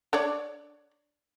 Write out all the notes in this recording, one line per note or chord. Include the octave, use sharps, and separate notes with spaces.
D4 C#5 D5